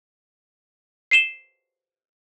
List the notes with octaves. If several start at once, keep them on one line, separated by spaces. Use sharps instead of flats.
C7 D#7 E7 G7